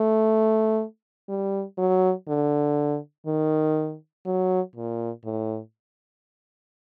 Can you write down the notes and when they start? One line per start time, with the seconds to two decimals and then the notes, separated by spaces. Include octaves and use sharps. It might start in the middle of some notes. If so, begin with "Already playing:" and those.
Already playing: A3
1.29 G3
1.78 F#3
2.28 D3
3.27 D#3
4.26 F#3
4.76 A#2
5.25 A2